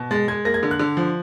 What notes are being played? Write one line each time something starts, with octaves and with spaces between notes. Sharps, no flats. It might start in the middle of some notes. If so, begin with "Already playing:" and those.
Already playing: B2
G#3 A6
G#3 G#6
A#3 A#6
G#6
D3
F#6
D3
F3